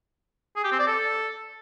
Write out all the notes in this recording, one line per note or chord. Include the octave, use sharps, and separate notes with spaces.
G#4
G4
C4
D5
A4